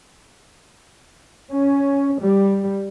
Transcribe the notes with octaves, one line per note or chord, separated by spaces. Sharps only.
C#4
G3